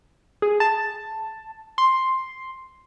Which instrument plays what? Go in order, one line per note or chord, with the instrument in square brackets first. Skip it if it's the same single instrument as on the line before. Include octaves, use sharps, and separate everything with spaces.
[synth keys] G#4
A5
C6